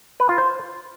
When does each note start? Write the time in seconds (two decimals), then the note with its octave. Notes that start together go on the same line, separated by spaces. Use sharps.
0.20 B4
0.29 F4
0.38 C5